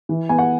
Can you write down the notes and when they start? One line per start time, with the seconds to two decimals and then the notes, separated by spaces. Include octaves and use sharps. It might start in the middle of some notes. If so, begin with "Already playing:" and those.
0.09 E3
0.29 B3 G#5
0.38 F#5